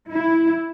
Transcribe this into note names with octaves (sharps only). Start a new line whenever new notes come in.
E4